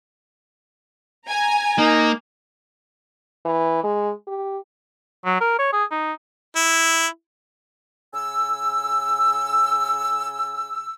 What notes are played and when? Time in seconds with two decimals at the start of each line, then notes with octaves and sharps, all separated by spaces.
1.27 G#5 A#5
1.78 A#3 D#4
3.45 E3
3.84 G#3
4.27 G4
5.25 F#3
5.41 A#4
5.59 C#5
5.73 G#4
5.91 D#4
6.56 E4
8.14 C#3 G#5 E6